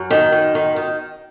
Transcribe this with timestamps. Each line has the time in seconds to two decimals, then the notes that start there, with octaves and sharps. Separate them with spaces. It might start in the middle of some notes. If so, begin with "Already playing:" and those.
Already playing: F#2
0.10 D#3
0.32 F#2
0.55 D#3
0.76 D#3